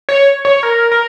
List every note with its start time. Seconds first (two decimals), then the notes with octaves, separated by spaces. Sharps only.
0.09 C#5
0.45 C#5
0.63 A#4
0.92 A#4